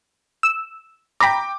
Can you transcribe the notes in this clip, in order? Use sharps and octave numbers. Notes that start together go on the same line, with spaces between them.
E6
G5 A#5 B5 D6